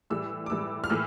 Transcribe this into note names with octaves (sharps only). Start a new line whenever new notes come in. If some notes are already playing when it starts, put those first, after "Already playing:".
A2 E3 G3 E6
D6
A2 E3 G3 E6
F6
A2 E3 E6